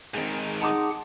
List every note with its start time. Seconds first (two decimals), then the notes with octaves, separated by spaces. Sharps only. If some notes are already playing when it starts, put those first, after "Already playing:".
0.14 G#2 D#3 C4 G#4
0.61 D#4 G#4 F#5 A5 C6 D6